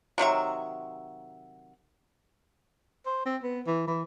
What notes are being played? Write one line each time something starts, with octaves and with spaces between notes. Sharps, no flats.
C3 D#3 F#3 E5
C5
C4
B3
E3
E3